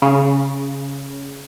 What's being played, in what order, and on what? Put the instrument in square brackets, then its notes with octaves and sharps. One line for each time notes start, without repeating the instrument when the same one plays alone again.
[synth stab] C#3